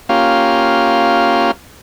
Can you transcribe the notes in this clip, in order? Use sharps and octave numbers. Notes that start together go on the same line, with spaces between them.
A#3 C#4 F4 G4 F5